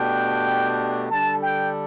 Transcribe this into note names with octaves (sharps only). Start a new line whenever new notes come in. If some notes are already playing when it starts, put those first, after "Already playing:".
Already playing: B2 A3 D4 G4 G5
D3 G3 D4 A4 A5
G5